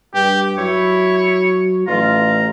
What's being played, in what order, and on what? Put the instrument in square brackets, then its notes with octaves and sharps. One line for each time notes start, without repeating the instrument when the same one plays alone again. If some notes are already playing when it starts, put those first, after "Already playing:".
[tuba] G2 [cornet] G4
[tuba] F#3 [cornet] E4 [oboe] C#5
[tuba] A1 [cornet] F4 [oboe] A#5